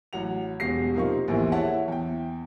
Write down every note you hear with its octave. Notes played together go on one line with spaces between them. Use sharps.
A1 F#3 F#5 F7
E1 B2 G3 A#6 C7
C3 F3 A#3 D#4 F5 C#6
A#1 E2 A#2 E3 G3
E4 G#4 C#5 E5 F#5 A5
E2 G5